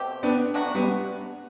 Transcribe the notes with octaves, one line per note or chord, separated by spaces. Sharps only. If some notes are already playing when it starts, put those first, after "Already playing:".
Already playing: B2 A3 C4 G4
B3 D4
F#3 A3 D4 F#4
G3 B3